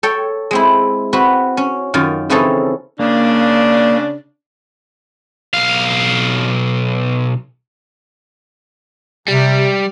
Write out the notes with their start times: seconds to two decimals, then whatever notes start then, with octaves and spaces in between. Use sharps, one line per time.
0.03 A4 C#5 G5
0.51 G#3 C4 E4
1.13 C4 F#4 B4
1.57 C#4
1.94 F#2 D#3 F4
2.30 C#3 E3 C4 C#4 D#4 A4
2.99 C#3 A#3 D4
5.54 B1 F5
9.28 C3 G3